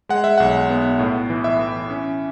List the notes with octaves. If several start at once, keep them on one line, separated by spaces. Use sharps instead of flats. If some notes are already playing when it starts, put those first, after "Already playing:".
G#3 F#5
E5
B1 F#5
B3
A2
E3
E5
E3
C#4